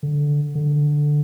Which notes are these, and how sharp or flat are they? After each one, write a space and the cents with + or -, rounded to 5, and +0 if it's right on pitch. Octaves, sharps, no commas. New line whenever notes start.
D3 -5
D3 +5